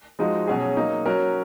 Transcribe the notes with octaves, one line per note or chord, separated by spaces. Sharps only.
F3 G#3 D#4 F#4
B2 F#3 C#4 G#4
F#3 A#3 D#4
F#3 C#4 F#4 A#4